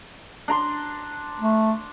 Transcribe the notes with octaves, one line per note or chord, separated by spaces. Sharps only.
D4 A#5 C6
A3